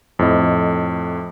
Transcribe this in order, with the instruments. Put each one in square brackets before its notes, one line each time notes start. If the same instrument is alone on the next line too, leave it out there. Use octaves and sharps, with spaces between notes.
[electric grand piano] F2 A2 D#5